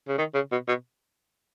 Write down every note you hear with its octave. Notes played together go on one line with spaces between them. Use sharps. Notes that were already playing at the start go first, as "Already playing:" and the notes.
C#3
D#3
C#3
B2
B2